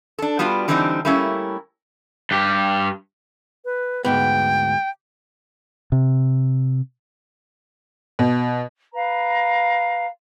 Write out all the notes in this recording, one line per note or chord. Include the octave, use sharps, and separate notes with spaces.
D4 A4
G3 B3 D4 F4 F#4
D3 E3 G3 C4 D4 D#4
G3 A3 A#3 C#4 E4
G2 G4
B4
D2 G#2 B3 G5
C3
B2
B4 F5 A#5